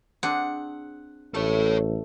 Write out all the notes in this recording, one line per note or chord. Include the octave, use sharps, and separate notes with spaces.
C4 D4 G#4 F#5
A1 A3 A4 C#5